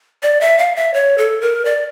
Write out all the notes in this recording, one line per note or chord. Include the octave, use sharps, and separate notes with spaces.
D5
E5
F5
E5
C#5
A4
A#4
D5